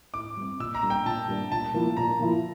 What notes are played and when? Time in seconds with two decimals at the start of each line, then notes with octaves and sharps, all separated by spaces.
0.14 A2 D6
0.37 G3 C4
0.60 A#2 E6
0.75 A#5
0.83 G3 A#3 D4
0.90 G5
1.05 A#2 A5
1.28 G3 A#3 D4
1.51 A#2 A5
1.74 F3 A#3 E4
1.97 A#2 A#5
2.19 F3 A#3 E4